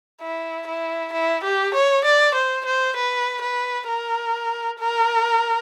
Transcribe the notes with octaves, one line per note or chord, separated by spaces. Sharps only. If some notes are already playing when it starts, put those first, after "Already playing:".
E4
E4
E4
G4
C#5
D5
C5
C5
B4
B4
A#4
A#4